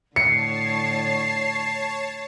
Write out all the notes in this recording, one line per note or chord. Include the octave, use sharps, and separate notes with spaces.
A2 D3 C#5 A5 C7 C#7